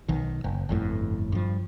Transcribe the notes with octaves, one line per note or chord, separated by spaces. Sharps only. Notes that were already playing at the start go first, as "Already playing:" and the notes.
B1 D#3
F#1
G1 F2 A2
G2 F3